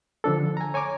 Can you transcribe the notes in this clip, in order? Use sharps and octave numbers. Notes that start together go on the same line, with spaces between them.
D3 F3 D4 A4
G#5 A#5
C#5 G#5 A#5 D6